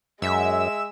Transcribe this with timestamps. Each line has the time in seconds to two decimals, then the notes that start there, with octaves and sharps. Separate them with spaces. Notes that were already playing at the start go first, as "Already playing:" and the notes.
0.22 F#2 G#3 E5 E6